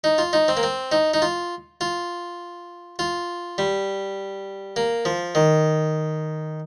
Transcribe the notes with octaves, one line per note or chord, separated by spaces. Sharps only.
D#4
F4
D#4
C4
A#3
C4
D#4
D#4
F4
F4
F4
G3
A#3
F3
D#3